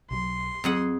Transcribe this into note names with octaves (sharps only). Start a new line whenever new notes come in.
B1 F#3 C6
F2 F#3 G#4 F#5